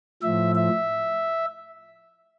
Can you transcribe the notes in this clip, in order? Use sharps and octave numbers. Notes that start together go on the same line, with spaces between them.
A2 F3 E5
E5